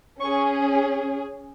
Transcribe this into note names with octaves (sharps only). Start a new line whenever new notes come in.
C#4 G#4 C#6